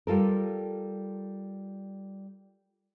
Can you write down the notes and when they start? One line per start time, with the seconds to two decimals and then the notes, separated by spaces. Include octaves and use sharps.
0.07 G3 F4 A4 A#4